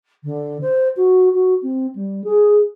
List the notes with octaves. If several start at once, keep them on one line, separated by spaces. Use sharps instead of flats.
D3
C5
F#4
F#4
C4
G3
G#4